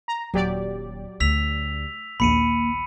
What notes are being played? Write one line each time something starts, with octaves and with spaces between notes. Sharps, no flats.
A#5
D#1 F#3 G4 D5
D2 E6 B6 F7
A#1 D#2 A#3 B5 C#7 D#7